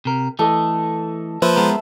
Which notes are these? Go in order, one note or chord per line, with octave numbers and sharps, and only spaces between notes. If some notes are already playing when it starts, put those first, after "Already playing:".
C3 A#4
E3 A3 A4 D#5
F3 A#3 B4 C5 E5
G#3 B3 A#4